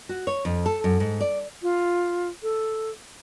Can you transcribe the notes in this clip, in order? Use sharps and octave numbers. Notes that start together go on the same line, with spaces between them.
F#4
C#5
F2
A4
F#2
G#2
D5
F4
A4